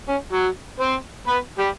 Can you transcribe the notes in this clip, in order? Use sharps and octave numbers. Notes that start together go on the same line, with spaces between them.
C#4
F#3 F#4
C4 C5
B3 B4
G3 G4